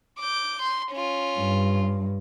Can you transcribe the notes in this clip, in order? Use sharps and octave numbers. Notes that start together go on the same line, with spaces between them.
D6 G6
C6
C#4 F4
G2